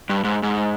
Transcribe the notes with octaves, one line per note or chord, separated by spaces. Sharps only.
G2
G#2
G#2